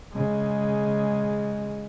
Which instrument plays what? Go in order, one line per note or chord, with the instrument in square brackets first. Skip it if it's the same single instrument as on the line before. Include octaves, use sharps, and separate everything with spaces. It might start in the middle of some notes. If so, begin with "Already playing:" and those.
[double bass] C#3 G#3